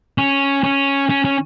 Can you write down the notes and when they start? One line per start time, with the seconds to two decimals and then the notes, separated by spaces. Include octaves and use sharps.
0.18 C#4
0.64 C#4
1.09 C#4
1.25 C#4